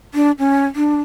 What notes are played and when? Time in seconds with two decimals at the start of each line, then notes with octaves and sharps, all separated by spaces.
0.14 D4
0.39 C#4
0.76 D4